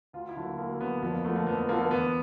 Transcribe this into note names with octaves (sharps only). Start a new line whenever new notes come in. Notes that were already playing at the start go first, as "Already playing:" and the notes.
D2 F4
E4
D3 F#3
A#3
D2 A#3
D3 F#3 B3
F2 B3
A#3
D3 F3 A3
A#3
F2 B3
B3
D3 F3 A#3
A#3
E2 B3